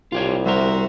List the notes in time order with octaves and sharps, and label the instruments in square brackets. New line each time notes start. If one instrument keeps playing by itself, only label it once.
[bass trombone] C2 [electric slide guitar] F4 G4 C#5
[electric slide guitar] G3 A#4 [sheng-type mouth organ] F#4 C5 E5